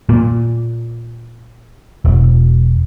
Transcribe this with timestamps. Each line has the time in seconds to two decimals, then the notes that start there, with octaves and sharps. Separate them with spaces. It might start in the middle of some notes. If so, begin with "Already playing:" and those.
0.09 A#2
2.05 E1